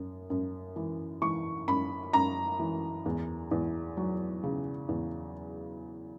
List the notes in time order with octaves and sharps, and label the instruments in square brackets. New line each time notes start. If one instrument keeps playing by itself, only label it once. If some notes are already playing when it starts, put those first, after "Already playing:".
Already playing: [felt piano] F#2
F#2
E3
E3 C#6
F#2 B5
F#2 A#5
E3
E2
E2
F#3
C#3
E2